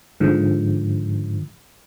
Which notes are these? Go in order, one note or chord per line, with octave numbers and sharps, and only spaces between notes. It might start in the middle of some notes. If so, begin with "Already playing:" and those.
G#2 D3 F3